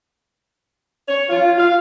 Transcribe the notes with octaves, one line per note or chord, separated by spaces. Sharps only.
C#5
F4
F5